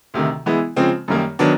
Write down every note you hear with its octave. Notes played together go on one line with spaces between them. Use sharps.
D2 C3 D#3
E3 G#3 B3 E4
C#3 F3 G#3 C4
F#2 D#3 G3 A#3
D#3 F#3 B3 D4